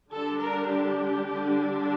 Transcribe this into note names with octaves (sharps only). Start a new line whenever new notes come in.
D3 G3 D4 A4
A#4
G4
D3 G3 D4